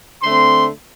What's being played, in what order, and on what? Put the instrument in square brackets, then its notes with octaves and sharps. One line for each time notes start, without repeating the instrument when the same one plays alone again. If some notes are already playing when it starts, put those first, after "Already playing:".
[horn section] D3 A3 C4 C6